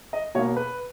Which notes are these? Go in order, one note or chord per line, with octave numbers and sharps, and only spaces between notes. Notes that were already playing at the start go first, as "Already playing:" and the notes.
D#5
B2 A#3 C#5
B4